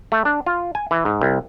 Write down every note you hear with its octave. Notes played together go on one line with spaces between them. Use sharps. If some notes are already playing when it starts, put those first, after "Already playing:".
A3
D4
F4
G#5
E3
G#2
C2